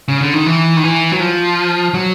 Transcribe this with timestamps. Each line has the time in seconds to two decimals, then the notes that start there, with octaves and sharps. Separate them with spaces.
0.08 C#3
0.21 D3
0.34 D#3
0.46 E3
0.77 D#3
0.84 E3
1.12 F#3
1.20 F3
1.94 F#3